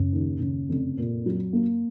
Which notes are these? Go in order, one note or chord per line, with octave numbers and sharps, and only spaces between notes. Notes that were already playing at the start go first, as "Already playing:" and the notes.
Already playing: F#2 C#3
D#2
C#3
F1
A#2
F#3
A#3